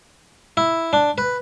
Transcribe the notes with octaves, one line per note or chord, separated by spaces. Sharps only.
E4
D4
B4